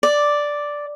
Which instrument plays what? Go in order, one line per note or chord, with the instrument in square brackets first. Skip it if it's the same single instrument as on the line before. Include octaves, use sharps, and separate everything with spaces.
[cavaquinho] D5